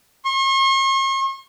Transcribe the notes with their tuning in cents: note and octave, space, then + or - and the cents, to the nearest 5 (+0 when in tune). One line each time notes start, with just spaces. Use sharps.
C#6 -45